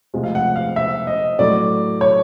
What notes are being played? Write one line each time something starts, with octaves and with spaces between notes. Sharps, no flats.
D2 C3 F3 G#3
F5
F#5
F5
E5
D#5
A2 F#3 A3 D5
C#5